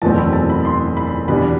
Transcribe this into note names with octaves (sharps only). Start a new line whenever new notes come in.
F#1 E2 B2 A3 C4 A5
B5
A5
B5
C6
B5
E2 B2 G3 D4 B5